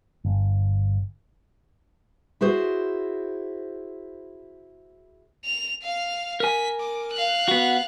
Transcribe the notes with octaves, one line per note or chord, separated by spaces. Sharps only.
G1
E4 F#4 G#4 C5
F7
F5 F6
A#4 G#5 B6
D6
F5 F#6
B3 F#4